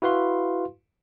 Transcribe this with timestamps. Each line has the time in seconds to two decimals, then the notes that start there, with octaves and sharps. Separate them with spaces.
0.02 E4 F#4 B4 F5 C6